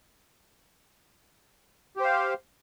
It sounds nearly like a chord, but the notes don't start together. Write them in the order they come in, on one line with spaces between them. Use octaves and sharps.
G4 C5 F5